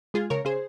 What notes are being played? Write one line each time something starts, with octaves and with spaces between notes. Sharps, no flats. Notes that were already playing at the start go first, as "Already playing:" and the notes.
G#3 F4 G#4
C#3 A#4 C#5
C#3 G#4 C5